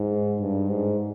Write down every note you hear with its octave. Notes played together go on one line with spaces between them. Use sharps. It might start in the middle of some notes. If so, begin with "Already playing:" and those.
Already playing: G#2
G2
G#2